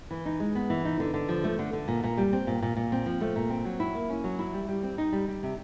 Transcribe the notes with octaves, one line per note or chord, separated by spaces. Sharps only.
E3
D#4
G#3
B3
E3
D#4
D3
D3
F3
A3
D3
D3
A#2
A#2
G3
C4
A#2
A#2
A#2
C4
F3
A3
A#2
C4
F#3
E4
A#3
C#4
F#3
E4
G3
G3
C4
D#4
G3
G3
C3